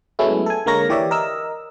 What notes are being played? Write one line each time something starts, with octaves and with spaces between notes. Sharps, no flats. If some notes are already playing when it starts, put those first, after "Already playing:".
F#3 G#3 A3 B3 C#4 E4
A4 G#5
D3 G#3 A#3 A#4 C#5 A#6
E3 G4 C#5 D5 E5
A#4 D#5 E6